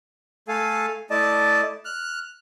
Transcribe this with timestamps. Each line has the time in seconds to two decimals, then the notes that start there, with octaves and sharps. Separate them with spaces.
0.48 A3 A4 F5 G#5
1.10 A3 E4 D5 D#5 A5
1.85 F6 F#6